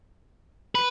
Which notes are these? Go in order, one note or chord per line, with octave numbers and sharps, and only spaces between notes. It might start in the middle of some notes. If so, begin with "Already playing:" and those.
B4